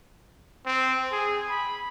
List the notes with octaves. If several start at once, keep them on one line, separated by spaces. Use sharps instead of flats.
C4
G#4
B5